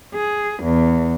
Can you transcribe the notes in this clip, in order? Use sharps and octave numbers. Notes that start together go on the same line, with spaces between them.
G#4
E2